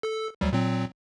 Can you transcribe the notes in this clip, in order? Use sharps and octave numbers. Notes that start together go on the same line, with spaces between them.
A4 E6
D2 F#3 G3
A#2 F#3 C4